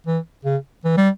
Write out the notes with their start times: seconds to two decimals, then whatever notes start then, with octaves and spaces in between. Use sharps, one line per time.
0.07 E3
0.45 C#3
0.84 E3
0.97 G3